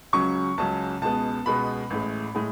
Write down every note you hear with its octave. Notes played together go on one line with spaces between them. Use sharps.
C#2 C#3 F#3 C#4 C#6
C#2 C#3 F#3 C#4 A5
C#2 B2 G#3 B3 A5
C#2 B2 G#3 B3 B5
A1 A2 G#3
A2 G#3